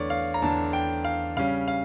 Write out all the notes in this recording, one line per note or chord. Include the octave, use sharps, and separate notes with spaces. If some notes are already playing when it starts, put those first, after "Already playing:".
Already playing: E2 D3 A3 D4 C#5 D5
F5
A#5
E2 D3 A3 D4 A5
G5
F5
C#3 G3 C#4 F5
F5